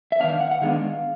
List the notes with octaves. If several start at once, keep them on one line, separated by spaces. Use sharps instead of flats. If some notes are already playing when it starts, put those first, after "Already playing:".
E5
D#3 G#3 B3 D4 F5
F#5
F#5
D#3 G#3 B3 D4 F5